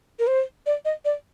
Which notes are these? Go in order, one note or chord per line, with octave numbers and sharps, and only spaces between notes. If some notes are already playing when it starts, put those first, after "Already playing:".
A#4
C5
D5
D#5
D5